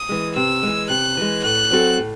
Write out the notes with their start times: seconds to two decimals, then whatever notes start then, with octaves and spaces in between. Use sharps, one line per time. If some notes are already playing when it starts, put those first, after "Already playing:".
Already playing: D#6
0.09 E3 G#3
0.36 C3 E6
0.63 E3 G#3
0.89 C3 F#6
1.17 E3 G#3
1.44 A2 F#6
1.71 F#3 C4 F#4 A4
1.98 A2